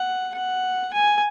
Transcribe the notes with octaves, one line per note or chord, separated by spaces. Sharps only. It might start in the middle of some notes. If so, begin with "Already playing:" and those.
Already playing: F#5
F#5
G#5